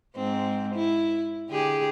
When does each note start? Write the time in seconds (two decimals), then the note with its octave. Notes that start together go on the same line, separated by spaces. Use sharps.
0.16 G#2 C4
0.75 E4
1.49 D3 G4 G#4